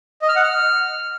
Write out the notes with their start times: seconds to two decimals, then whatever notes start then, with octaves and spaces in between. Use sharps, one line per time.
0.22 D#5
0.29 F6
0.36 F#5
0.43 F6